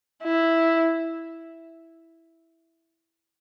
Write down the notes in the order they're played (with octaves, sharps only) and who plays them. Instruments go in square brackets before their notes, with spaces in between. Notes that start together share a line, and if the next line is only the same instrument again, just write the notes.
[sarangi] E4